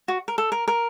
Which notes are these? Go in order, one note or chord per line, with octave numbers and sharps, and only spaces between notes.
F#4
A#4
A4
A#4
A#4